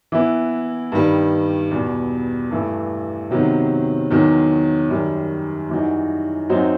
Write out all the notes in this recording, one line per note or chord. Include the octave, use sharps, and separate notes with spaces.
E3 B3 E4
G2 D#3 G3
E2 B2 G3
G2 E3 A3
C3 D#3 F#3 B3
E2 D#3 F#3
F#2 D#3 G3
F#2 E3 G3 D#4 F#4
F#2 F#3 C4 D#4 F#4